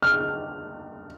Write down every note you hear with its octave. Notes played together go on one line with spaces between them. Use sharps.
F6